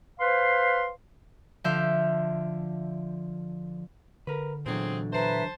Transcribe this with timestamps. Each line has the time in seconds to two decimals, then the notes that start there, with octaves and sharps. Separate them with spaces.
0.20 B4 C5 F5 C6
1.64 D3 F3 E5 F5 G6
4.27 D3 A#4 B4
4.66 E2 A#2 D3 F#3 C4 G#4
5.13 B4 C5 E5 A5 A#5